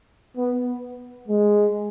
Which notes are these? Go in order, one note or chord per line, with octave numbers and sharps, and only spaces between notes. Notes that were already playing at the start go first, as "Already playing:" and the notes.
B3
G#3